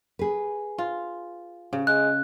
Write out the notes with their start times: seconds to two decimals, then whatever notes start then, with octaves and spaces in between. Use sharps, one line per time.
0.19 G#4 B4
0.78 F4
1.73 C#3
1.87 G#3 F#6